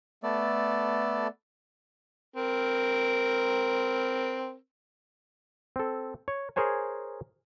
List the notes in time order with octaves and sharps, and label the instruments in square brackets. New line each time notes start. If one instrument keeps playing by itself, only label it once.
[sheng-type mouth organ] A3 B3 A4 D5
[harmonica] C4 A#4
[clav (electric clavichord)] C4 A4
C#5
G#4 A#4 C5 C#5 G#5